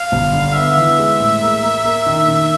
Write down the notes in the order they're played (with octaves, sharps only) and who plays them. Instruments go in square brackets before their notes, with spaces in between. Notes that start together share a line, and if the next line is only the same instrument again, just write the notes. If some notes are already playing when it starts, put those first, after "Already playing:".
Already playing: [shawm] F5
[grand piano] G1
D3
[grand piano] B3 [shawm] E5
[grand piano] E3
G#3
A2
A#3
A#3
A#3
D#3
D#3